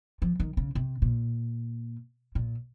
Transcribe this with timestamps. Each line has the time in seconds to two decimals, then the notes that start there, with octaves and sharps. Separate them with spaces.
0.22 F3
0.40 D#3
0.57 C#3
0.75 C3
1.02 A#2
2.35 A#2